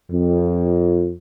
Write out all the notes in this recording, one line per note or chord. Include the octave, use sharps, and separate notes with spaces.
F2